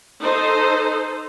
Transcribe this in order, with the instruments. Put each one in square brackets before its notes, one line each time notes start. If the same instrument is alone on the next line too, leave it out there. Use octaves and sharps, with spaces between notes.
[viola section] D#4 A4 C5